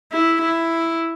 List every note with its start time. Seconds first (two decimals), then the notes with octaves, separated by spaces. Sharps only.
0.12 E4
0.42 E4